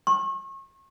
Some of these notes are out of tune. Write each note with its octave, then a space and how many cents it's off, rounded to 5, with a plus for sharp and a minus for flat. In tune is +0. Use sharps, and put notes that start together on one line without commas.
C#6 -40